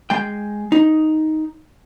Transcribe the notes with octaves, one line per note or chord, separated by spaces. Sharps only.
G#3 G5
D#4